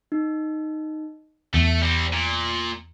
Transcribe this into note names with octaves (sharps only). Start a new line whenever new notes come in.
D#4
E2 A3 C#7
G3 C4
A#2